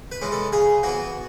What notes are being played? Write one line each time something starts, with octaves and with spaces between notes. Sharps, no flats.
B4
E3 G#3 C#4
A4
C#3 G#4
E3 B3 F#4